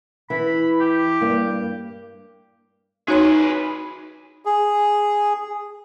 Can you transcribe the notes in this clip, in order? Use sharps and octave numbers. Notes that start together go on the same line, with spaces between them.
E3 B5
G4
G2 A#3
D#4 F#4 G#4 B4 C#5 C6
G#4